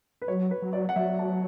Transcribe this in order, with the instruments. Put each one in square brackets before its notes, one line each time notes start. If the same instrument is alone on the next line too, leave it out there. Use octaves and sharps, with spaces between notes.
[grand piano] B4
[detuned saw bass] F#3 [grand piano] C#5
[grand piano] B4
[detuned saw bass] F#3
[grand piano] D5
F#5
[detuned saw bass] F#3 [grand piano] E5
[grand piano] A5